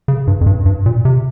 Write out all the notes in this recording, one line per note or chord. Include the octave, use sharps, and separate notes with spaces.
C#3
G2
F2
G2
G2
A#2
C3